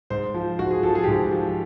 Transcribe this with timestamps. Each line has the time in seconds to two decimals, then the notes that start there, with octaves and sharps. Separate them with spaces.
0.10 G#2 C5
0.34 F3
0.59 G#2 F#4
0.71 G#4
0.83 F3 A4
0.95 G#4
1.03 G4
1.08 G#2 G#4
1.31 F3